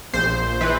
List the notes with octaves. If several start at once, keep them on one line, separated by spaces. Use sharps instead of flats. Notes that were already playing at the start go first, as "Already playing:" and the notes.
A#1 C5
E3 B4